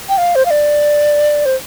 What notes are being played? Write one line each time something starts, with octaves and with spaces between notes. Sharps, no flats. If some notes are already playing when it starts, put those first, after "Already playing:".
G5
F5
C5
F5
D5
C5